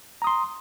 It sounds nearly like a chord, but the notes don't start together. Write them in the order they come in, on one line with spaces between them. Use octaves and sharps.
A#5 D#6 C6